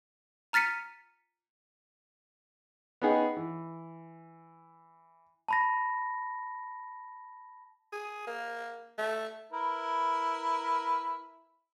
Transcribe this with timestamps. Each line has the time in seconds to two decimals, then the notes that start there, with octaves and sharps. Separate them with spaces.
0.53 A#5 F6 A6 B6 C#7 D#7
3.02 B3 C#4 D#4 G#4 F#5 G5
3.37 E3
5.48 A5 B5 A#6
7.92 G#4
8.27 A#3
8.98 A3
9.52 E4 A#4 B4